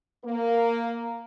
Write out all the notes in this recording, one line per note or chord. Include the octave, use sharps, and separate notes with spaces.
A#3